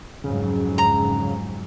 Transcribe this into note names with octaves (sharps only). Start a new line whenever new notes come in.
F2 G#2 C#3 F#3
A#5